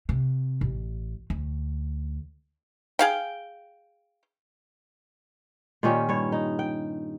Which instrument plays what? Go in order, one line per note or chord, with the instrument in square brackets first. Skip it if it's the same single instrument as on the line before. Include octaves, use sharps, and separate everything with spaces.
[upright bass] C3
A1
D2
[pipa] G#4 F5 G5
[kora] A#2 D#3 C#4 G4
G2 C#5
D#4
G5